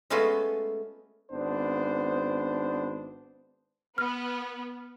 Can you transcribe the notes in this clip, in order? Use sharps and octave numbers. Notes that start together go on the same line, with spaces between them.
G#3 A3 B3 C#4 F4 F#4
G#1 B3 D4 C5
B3 F6